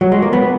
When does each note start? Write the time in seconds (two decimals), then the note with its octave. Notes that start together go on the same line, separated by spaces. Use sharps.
0.01 F#3
0.12 G#3
0.22 A#3
0.33 B3